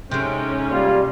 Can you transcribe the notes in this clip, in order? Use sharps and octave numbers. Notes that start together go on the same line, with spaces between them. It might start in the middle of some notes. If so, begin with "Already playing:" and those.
C3 G#3 C#4 D#4 A4 G5
G3 A#3 F4